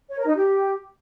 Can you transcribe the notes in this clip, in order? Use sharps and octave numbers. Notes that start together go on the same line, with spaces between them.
C#5
A#4
D#4
G4